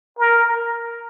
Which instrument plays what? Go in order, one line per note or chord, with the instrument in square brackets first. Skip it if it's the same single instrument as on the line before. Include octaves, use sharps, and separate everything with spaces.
[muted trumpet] A#4